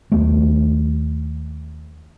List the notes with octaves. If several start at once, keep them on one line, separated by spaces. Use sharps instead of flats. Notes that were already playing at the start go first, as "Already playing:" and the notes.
D#2 A3